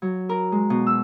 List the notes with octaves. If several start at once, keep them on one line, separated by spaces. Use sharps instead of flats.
F#3
A#4
G#3
B2
E6